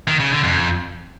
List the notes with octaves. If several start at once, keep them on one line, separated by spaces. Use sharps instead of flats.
D#3
C#3
D3
F2